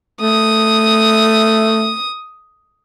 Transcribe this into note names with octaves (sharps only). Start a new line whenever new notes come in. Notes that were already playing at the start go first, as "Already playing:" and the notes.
A3 D#6